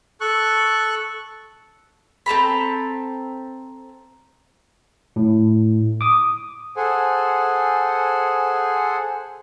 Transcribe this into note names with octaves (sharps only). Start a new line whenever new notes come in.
A4 C#6 F#6
C4 A4 A#5 B5
A2
D6 D#6
G#4 A4 C5 F#5 G#5